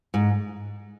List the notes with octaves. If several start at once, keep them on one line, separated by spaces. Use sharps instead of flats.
G#2